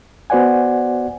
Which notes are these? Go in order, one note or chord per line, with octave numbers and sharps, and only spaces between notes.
B3 F#4 C5 D5 F#5 G#5